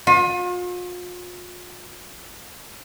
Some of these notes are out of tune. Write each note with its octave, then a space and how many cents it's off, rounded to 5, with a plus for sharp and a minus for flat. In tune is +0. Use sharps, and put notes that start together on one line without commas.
F4 +40